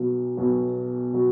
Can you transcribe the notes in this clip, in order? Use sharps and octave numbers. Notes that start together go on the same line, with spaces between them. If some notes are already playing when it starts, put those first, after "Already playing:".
Already playing: B1 B2 F#3
B1 B2 F#3
B2 F#3